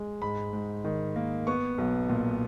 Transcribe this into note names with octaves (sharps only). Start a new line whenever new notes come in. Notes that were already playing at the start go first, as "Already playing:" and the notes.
Already playing: G#3
G#2 B5
G#2
D#3
A#3
B3 C#6
B1
A#2